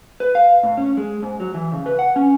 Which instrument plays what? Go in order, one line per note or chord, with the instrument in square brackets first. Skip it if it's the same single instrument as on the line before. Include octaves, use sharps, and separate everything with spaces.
[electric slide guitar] B4
F5
A2
C#4
G#3
G#2
F#3
E3
C#3
B4
F#5
C#4